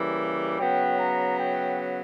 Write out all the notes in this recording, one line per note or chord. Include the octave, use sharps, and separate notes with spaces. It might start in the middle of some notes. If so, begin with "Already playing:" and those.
Already playing: C#3 E3 G3 A#3
C#3 F#3 B3 G5
A#5
G5